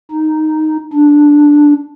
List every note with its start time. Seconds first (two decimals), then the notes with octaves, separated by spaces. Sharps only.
0.12 D#4
0.93 D4